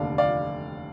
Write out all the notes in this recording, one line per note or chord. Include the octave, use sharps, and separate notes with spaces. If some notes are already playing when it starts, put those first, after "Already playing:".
Already playing: F1 D#2 D3 D5 F5
D5 F5